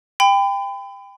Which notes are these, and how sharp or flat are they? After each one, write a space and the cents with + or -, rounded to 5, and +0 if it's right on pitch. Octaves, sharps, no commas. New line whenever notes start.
G5 +20 B5 +35